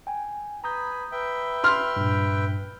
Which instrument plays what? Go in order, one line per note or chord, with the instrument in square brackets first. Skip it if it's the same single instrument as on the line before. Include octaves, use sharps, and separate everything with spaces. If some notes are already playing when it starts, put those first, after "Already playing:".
[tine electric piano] G5 G#5
[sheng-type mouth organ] B4 G#5 B5 [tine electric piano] A#5 D#6 G6
[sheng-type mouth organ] B4 E5 G5
[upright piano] C6 F6
[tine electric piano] G2 A#2